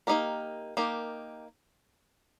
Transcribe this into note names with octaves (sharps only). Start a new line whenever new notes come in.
A#3 D#4 G4 A#4
A#3 D#4 G4 A#4